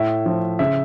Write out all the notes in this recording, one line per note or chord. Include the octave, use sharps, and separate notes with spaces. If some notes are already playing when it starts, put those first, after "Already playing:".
Already playing: A2 E5
F3
C#3 E5